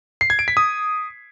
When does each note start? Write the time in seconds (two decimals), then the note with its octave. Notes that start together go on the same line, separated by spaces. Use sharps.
0.21 C7
0.30 G#6
0.39 D7
0.48 B6
0.57 D#6